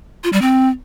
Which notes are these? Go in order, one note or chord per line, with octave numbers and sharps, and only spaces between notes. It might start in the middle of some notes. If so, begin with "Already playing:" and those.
F4
G3
C4